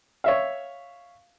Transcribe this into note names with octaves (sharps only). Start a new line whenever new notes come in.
C#5 E5 F5